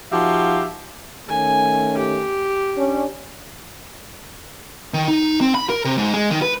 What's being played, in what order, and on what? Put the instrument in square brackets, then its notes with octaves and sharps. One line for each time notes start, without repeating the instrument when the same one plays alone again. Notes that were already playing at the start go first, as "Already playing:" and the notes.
[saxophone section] F3 D#4 F#4 G4 E5 F5
[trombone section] D#3 A3 C#4 [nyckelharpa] G#5
[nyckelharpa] G4
[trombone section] C#4 D4
[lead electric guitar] D#3
D#4
C4
B5
A#4
C3
G#2
G#3
D#3
B4